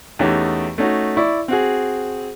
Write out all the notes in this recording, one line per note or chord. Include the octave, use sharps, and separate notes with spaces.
E2 A3 C#4 D#4 G4
A3 C#4 D#4 F#4
E4 D5 C#6
C4 F#4 G#4